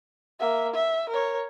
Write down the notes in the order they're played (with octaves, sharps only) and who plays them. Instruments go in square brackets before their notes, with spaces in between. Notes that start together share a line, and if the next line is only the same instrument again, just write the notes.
[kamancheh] A#3 E5
E5
A#4 C#5